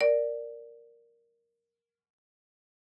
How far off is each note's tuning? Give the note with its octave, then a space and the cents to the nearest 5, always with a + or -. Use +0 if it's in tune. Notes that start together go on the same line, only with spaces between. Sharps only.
A#4 +0 D5 +0